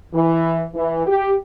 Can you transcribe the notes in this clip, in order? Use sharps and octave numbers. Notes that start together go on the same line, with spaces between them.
E3
E3
G4